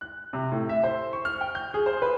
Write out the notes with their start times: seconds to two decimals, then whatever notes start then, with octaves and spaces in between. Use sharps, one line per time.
0.01 F#6
0.33 C3
0.52 A2
0.69 E5
0.84 C5
1.13 C#6
1.25 F6
1.41 G5
1.55 G6
1.74 G#4
1.86 C5
2.02 B4